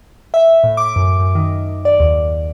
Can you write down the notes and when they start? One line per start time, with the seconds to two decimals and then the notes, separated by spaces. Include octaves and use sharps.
0.34 E5
0.64 A2
0.77 D6
0.96 F#2
1.19 F#2
1.35 D#3
1.85 D5
2.00 D#2